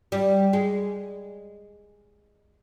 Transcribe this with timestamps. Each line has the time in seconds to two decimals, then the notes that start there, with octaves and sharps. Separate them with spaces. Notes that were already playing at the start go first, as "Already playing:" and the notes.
0.12 G3
0.53 G#3